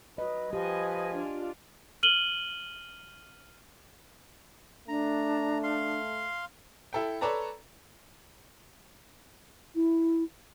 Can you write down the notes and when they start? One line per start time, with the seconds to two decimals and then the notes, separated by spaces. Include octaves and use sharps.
0.18 F#3 B4 D#5
0.53 F3 G4 B4 D#5 G#5
1.15 D4 F4
2.03 F6 D#7 F#7 G7
4.88 A3 D4 A#5
5.63 F5 C6
6.93 E4 A4 G5
7.21 A4 B4 C#5 D5 A5 A#5
9.75 E4